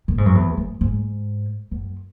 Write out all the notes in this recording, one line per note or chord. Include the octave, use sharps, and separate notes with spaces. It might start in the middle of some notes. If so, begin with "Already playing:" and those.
A#2
G#2
F#2
E2
F#2
G#2
F#2